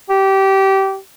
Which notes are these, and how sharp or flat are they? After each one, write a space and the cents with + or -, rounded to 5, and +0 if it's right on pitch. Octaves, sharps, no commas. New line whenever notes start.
G4 -20